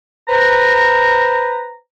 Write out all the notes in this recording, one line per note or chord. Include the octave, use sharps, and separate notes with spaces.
B4 C5 A#5